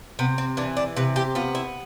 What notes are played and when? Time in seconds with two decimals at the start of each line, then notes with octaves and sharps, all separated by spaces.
0.19 C3 B3
0.38 C4
0.57 E3 D4
0.77 D4
0.97 C3 B4
1.16 G4
1.35 B3 F4
1.55 E4